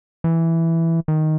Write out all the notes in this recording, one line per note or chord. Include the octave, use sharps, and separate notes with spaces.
E3
D#3